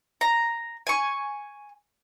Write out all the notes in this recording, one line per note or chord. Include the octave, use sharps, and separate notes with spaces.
A#5
G#5 C#6